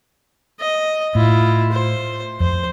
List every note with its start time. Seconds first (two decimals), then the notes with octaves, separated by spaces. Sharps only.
0.60 D#5
1.15 A2 E4 F4
1.72 C5
2.40 F2 C5